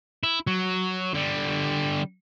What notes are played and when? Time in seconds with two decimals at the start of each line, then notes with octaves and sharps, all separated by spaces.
0.23 E4
0.47 F#3
1.14 D3 G3